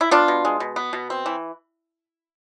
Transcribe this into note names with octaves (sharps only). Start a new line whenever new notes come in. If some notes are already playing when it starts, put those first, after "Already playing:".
E4
B3 D4 F4
B2
G#3
B2
B3
B2
C4
E3